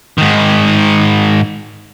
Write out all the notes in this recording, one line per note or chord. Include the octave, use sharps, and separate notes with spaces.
G#2 D#3